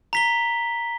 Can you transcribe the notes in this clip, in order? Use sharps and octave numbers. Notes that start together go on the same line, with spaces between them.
A#5 B6 G7